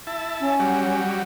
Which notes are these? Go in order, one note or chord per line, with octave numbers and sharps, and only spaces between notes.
E4 A5
C#4
F#3 G3